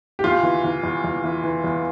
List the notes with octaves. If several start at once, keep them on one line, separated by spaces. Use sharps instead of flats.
G4
E2 F4
E3
E3
E2
E2
E3
E3
E2